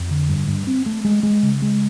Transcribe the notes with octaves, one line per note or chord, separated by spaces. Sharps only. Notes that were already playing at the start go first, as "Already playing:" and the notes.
Already playing: F2
D3
G2
G2
C4
A3
G#3
G#3
C#3
G#3